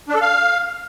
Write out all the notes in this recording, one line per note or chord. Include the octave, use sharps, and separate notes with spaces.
D4
A4
F5